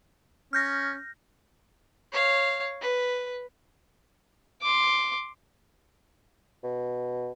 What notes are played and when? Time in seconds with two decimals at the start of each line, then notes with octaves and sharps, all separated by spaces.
0.53 C#4 F6 G6 A#6
2.12 C#5 F5
2.81 B4
4.62 C6 D6
6.63 B2